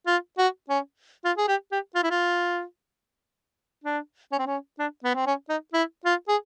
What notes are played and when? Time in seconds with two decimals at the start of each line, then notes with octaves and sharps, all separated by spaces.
0.07 F4
0.38 F#4
0.69 C#4
1.25 F4
1.37 G#4
1.48 G4
1.72 G4
1.95 F4
2.03 E4
2.11 F4
3.84 D4
4.32 C#4
4.39 C4
4.47 C#4
4.79 D4
5.04 B3
5.15 C4
5.27 C#4
5.49 D#4
5.73 E4
6.05 F4
6.28 G#4